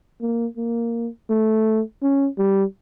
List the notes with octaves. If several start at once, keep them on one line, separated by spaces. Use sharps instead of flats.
A#3
A#3
A3
C#4
G3